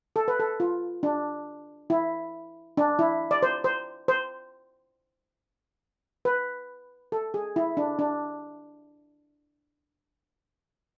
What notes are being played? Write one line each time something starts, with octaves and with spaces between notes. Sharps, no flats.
A4
B4
A4
F4
D4
E4
D4
E4
D5
C5
C5
C5
B4
A4
G#4
E4
D4
D4